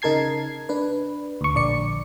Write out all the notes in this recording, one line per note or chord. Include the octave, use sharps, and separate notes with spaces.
C#3 D#4 A#4 A5 G#6 C7
D4 B4
D2 C#6
A#1 D3 D5 C#7